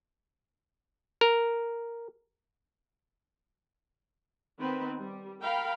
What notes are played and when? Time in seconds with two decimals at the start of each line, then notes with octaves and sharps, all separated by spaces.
1.21 A#4
4.60 D#3 B3 C4 B4
5.00 G3
5.42 A#4 F5 G5 B5